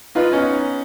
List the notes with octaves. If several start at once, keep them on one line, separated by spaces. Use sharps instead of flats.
D#4 F4 B4
B3 C#4 D#4